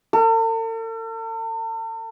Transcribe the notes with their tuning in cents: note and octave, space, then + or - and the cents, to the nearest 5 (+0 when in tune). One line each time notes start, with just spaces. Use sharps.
A4 +45